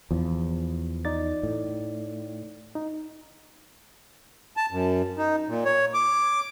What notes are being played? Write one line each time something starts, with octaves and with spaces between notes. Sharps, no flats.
E2 F3
D#4 D5 A6
A2
D#4
A5
F#2
D#4
A#2
C#5
D6